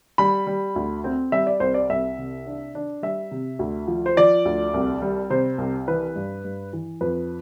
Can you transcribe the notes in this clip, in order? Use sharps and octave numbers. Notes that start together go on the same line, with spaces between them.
G3 B5
G3
D2
C4
G3 E5
D5
C2 C5
D5
C2 E5
C3
D4
D4
G3 E5
C3
D2
F3
C5
F3 D5
D2
C2
G3
C3 C5
C2
E3 B4
G2
G2
E3
F2 B4